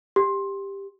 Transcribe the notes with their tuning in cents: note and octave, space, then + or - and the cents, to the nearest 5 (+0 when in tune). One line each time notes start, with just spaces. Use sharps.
G4 +10